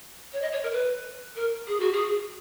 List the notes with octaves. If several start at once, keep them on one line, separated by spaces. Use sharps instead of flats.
C#5
D#5
C#5
A#4
B4
A#4
G#4
F#4
G#4